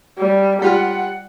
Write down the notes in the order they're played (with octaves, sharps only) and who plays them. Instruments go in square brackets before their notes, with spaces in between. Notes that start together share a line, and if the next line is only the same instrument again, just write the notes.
[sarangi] G3
[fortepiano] G3 F4 F6 [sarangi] F#5